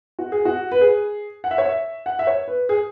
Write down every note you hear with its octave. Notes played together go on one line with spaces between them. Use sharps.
F#4
G#4
F#4
B4
G#4
F#5
E5
C#5
E5
F#5
E5
C#5
B4
G#4